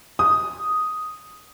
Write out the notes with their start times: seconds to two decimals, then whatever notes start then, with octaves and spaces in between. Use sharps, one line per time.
0.19 D#6